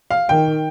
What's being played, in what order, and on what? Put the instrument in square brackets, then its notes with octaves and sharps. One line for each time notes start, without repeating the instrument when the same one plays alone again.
[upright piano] F5
[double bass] D#3 [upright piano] G5